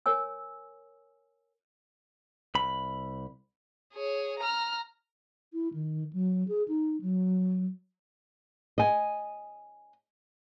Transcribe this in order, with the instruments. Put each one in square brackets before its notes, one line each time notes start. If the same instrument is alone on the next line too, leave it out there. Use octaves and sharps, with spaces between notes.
[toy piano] A#4 C#5 G#5 E6
[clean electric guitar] C2 B5
[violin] G#4 C#5
A#5 F6
[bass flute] E4
D#3
F#3
G#4
D#4
F#3
[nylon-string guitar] D#5 G#5